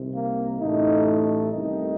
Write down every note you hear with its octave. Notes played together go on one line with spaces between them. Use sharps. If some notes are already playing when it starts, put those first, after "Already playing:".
Already playing: C2 C3 D#3
A#3
A1 A2 A3 D#4
C2 C3 D#3 A3 D#4